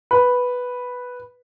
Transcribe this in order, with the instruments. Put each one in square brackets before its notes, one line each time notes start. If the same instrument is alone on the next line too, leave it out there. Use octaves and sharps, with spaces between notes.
[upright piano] B4